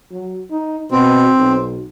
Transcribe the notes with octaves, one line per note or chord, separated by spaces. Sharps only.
F#3
D#4
B2 C4
B1